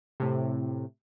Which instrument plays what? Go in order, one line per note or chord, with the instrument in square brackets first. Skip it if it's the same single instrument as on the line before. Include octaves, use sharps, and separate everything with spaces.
[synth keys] A2 C3